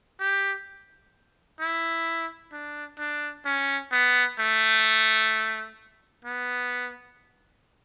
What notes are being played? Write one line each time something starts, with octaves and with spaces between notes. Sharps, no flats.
G4
E4
D4
D4
C#4
B3
A3
B3